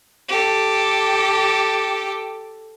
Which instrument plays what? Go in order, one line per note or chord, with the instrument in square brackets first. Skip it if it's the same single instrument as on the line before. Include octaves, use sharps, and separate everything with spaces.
[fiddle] G4 A4